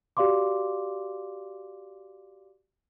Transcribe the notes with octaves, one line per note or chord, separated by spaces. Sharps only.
F#4 G4 D5 F5 C6 D6